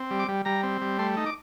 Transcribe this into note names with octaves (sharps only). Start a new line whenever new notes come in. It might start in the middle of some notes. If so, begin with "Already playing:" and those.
Already playing: C4
G3
D6
G3
G3 A#5
C4
G3
A3 C6
D#4
D6